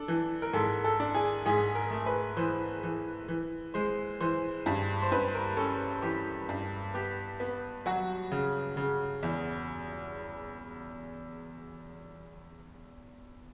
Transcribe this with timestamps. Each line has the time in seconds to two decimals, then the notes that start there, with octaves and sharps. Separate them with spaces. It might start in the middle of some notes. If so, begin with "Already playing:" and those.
Already playing: D4 A4
0.08 E3
0.42 A#4
0.53 G#2 A4
0.84 A4
1.00 D4
1.14 G#4
1.46 G#2 G#4
1.75 A#4
1.91 A3
2.06 B4
2.37 E3 C5
2.83 E3
3.28 E3
3.74 G#3 C5
4.20 E3 C5
4.66 G2
5.02 C5
5.12 G2 B4
5.34 A#4
5.57 C#4 A4
6.02 E3 G4
6.49 G2
6.94 B3 G4
7.40 B3
7.86 F#3 F#4
8.32 C#3
8.77 C#3
9.23 E2